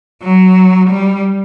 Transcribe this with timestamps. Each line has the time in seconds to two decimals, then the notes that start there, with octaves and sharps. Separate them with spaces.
0.23 F#3
0.90 G3